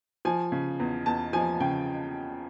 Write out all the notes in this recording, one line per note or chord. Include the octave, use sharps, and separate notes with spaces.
F3 G#5
C#3
E2
E2 A5
F3 G#5
C#3 G5